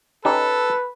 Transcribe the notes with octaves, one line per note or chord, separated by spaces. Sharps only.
C#4 D#4 G4 A4 B4